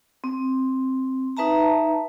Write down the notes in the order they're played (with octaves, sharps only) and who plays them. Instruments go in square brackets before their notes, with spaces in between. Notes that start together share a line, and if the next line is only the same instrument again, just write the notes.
[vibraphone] C4
D#4 B4 E5 A5 A#5